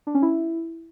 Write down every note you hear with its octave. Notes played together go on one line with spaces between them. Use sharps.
D4
C#4
E4